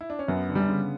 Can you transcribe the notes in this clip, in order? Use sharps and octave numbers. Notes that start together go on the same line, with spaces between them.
E4
D4
C#4
F#2 B3
D3
G3
C#3